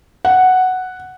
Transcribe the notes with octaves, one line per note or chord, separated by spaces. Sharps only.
F#5